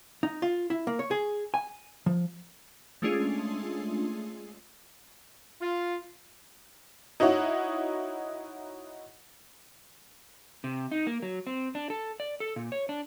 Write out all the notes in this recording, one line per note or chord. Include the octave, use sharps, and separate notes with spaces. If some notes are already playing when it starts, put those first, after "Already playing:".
D#4
F4
E4
A#3
C#5
G#4
G#5
F3
G#3 A3 C#4 D4 F4 G#4
F4
D#4 E4 F#4 C#5
C3
D#4
A#3
F#3
C4
D4
A4
D5
A4
A#2
C#5
D4